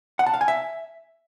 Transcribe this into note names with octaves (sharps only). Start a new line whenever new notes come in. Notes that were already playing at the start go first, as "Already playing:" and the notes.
F#5
A5
F5
G#5
E5